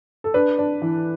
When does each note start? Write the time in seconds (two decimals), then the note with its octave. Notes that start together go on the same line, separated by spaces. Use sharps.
0.24 A4
0.34 D4 B4
0.59 D4
0.82 E3